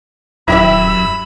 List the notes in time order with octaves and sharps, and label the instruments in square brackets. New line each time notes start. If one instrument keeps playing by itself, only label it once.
[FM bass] D#1 [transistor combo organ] F#2 E6 [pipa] E4 G4 E5 [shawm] B5